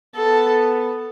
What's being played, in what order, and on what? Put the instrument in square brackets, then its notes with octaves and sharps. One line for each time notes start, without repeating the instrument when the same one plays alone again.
[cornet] B3 [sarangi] A4